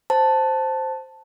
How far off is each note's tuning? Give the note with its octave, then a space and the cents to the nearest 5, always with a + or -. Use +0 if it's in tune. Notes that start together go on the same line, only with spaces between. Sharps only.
C5 +0 A5 +0